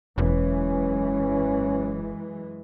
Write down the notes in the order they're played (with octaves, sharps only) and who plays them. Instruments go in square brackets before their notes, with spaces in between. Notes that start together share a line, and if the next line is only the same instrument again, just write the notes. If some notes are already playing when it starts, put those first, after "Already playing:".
[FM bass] E1 [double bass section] F#2 E3 G#3 [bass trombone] C#4